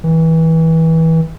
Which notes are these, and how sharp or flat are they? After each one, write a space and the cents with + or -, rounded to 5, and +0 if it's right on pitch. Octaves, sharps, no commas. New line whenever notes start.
E3 -25